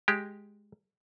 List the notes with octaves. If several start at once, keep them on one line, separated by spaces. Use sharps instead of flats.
G#3 G4